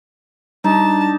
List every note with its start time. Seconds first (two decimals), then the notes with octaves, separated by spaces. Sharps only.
0.64 G3 D4 D#4 A5